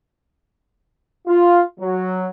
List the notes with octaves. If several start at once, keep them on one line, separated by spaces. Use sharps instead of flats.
F4
F#3